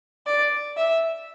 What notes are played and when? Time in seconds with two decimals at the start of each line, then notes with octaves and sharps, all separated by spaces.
0.27 D5
0.77 E5